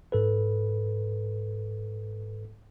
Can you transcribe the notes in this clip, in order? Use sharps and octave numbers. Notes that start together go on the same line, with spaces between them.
G#2 A4 B4